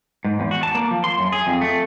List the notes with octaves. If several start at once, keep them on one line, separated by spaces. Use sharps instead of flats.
G#2
E2
F#4
A5
A#3
F3
C6
F#2
G#4
F2
A3